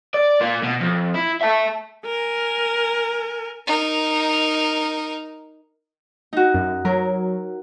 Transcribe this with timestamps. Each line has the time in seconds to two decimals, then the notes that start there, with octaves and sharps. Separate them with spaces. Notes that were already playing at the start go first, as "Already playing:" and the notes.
0.14 D5
0.41 A#3 F4
0.63 B2
0.80 F2
1.14 E4
1.41 E5 A5
2.05 A#4 G#5
3.67 D#4 A#4
6.33 D#4 F#4
6.54 F#2
6.85 F#3 A#4